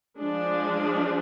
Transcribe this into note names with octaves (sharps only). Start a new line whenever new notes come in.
F3 G#3 D4